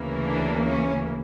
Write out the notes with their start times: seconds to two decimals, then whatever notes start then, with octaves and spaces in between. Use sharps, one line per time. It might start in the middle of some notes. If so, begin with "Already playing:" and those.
Already playing: D2 C#3 E3 A#3
0.27 D4
0.65 C#4